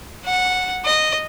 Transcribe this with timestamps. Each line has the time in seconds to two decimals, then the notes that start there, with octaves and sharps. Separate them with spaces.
0.25 F#5
0.84 D#5